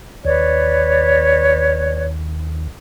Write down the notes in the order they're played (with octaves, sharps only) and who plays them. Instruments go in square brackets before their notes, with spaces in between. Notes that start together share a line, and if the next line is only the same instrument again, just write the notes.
[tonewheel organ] D#2 [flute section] B4 C#5 D5